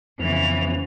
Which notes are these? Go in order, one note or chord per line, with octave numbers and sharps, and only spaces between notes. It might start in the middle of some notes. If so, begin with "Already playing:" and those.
F2 C#3 E3 F3 B3 C#4 F7